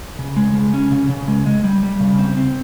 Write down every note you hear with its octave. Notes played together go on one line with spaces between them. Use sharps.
C#3
G#3
C#3
C#4
C#3
C#3
G#3
G#3
G3
G3
C#3
C4
C4